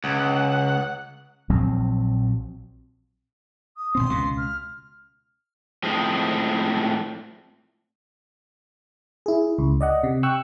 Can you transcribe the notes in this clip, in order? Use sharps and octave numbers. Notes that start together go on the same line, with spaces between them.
C#2 F#5
A#1 F3 F#3 C4
D#6
G#1 B2 C4 C6
C#2 B2
F6
A2 F3 G#3 C4
E4 G#4
C#2
D5 D#5 F#5
C3
G5 C#6 E6 F#6